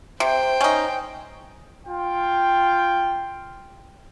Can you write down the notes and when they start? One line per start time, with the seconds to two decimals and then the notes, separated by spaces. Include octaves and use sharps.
0.20 C3 C5 G5
0.61 C#4 D#4
1.87 F4 G5